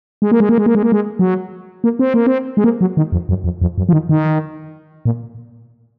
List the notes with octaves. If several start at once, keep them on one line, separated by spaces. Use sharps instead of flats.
G#3
A#3
G#3
A#3
G#3
A#3
G#3
A#3
G#3
F#3
A#3
C4
A#3
C4
G#3
A#3
F#3
D#3
F2
F#2
F2
F2
F#2
F3
D#3
D#3
A#2